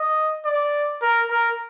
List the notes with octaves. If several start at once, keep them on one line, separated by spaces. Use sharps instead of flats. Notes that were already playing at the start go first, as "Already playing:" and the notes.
Already playing: D#5
D5
A#4
A#4